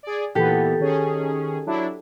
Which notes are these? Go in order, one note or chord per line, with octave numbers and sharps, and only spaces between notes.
G#4 D5
A#2 E3 B3 G4 A4
D#3 C#4 G#4
F#3 D4 E4